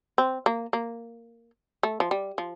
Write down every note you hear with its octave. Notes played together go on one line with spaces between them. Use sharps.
C4
A#3
A#3
A3
F3
G3
F3